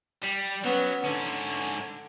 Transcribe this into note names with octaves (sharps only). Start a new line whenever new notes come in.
G3
F#3 B3 C#4
G#2 D3 C#4